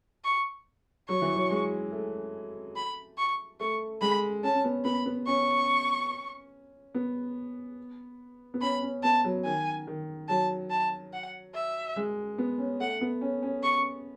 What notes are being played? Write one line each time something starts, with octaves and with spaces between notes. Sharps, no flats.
C#6
F#3 C#6
E3
F#3
G#3
A3
B5
C#6
A3 C#6
G#3 B5
C#4 A5
C#4
B3
B3 B5
B3
C#4 C#6
B3
B3
C#4 B5
C#4
B3 A5
F#3
D#3 G#5
D#3
F#3 A5
A5
F#5
E5
G#3
B3
C#4
A3 F#5
B3
C#4
C#4
C#6